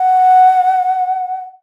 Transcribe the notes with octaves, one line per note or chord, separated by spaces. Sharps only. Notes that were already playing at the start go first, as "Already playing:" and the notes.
Already playing: F#5